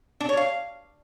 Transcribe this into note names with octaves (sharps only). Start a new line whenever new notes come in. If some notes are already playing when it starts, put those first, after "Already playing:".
D4
C#5
F5